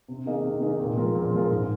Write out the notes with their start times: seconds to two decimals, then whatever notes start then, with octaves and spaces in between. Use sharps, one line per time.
0.08 C3
0.26 D#3 A#3 G#4 D#5
0.44 C3
0.61 D#3 A#3 G#4 D#5
0.80 A#2
0.97 F3 G#3 F4 A#4
1.15 A#2
1.33 F3 G#3 F4 A#4
1.51 G#2